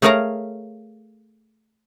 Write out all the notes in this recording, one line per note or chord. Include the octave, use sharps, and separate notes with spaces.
A3 G#4 A#4 C#5 F5 A#5